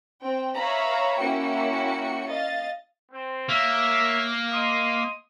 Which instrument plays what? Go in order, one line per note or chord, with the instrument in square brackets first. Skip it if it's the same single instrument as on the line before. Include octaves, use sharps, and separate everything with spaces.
[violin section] C4 G5
B4 C#5 E5 F5 A#5 B5
A#3 C#4 E4 F#4 G5 C#7
D#5 F5 A6
[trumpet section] C4
[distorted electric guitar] A#3 [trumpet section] C#5 E5
[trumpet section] D#5 C6 D#6